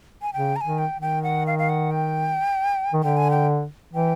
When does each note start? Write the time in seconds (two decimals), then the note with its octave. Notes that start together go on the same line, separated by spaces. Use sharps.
0.22 G#5
0.33 C#3 G5
0.56 A#5
0.61 D#3 G#5
0.78 G5
0.94 D#3
1.02 G5
1.23 F#5
1.47 F5
1.59 F5
1.69 F#5
1.91 G5
2.93 D#3
3.03 D3 G5
3.17 G#5
3.31 G5
3.93 E3 G5